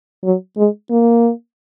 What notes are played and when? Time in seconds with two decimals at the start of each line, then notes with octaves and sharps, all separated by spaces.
0.24 F#3
0.57 G#3
0.90 A#3